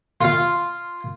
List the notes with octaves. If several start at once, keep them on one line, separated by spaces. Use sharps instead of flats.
F4 F5